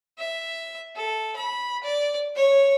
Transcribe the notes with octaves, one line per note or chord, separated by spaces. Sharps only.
E5
A4
B5
D5
C#5